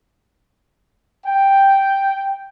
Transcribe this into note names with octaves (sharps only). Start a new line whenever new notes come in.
G5